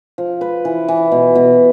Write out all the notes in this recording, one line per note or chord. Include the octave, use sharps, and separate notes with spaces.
F3
B4
E3
E3
B2
B2